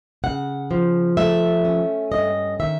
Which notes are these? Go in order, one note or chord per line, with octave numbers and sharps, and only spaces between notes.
C#3 F#5
F3
A3 E5
C#4
G2 D#5
D#3 E5